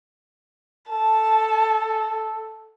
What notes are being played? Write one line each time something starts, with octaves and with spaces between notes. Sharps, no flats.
A4 A5